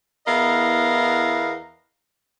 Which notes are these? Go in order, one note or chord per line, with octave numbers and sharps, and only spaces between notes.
E2 B3 E4 A#4 D#5 F5